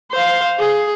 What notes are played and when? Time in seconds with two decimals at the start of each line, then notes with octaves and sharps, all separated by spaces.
0.12 C5 F5
0.59 G#4